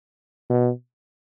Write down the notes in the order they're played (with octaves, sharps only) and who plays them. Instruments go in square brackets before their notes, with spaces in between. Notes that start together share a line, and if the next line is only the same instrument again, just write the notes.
[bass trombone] B2